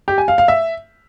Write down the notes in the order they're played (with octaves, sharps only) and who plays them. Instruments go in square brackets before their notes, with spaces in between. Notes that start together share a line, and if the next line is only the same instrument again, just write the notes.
[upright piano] G4
G#5
F5
F5
E5